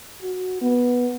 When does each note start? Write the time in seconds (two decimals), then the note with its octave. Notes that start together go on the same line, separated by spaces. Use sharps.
0.22 F#4
0.62 B3